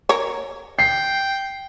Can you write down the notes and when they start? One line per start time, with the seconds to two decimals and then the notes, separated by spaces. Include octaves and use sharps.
0.09 A#4 C#5
0.79 G5 C7